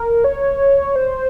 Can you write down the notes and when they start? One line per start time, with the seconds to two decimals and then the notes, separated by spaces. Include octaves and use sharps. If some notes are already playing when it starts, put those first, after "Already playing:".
Already playing: A#4
0.24 C#5
0.96 C5